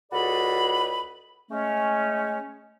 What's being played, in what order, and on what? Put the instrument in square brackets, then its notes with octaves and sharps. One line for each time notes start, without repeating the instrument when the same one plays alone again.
[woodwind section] C#2 F#4 G#4 A4 D5 B5
G#3 A3 C#4